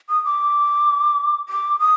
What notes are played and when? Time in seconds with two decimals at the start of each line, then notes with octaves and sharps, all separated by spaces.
0.09 D#6
0.25 D6
1.49 D6
1.79 D#6